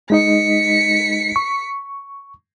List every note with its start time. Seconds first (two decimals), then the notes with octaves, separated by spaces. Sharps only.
0.10 G#3 D#4 D#5 B6 C#7
1.36 C#6